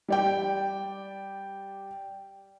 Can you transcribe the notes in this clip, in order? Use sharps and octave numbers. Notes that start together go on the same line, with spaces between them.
G3 D5 G5